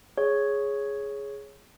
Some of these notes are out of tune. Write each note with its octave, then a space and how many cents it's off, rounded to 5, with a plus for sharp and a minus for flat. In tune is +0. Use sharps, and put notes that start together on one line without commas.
G#4 +0 C#5 +0